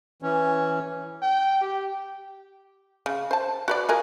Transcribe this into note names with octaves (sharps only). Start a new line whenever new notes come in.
E3 C#4
G5
G4
C#3
C5 A5
F#4 B4 D5
F4 G#4 A#4